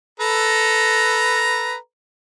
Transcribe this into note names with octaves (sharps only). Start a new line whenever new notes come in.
A4 B4 A#5